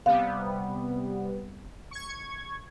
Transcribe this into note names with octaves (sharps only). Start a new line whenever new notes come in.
C3 G3 B3 F5
C#6 G#6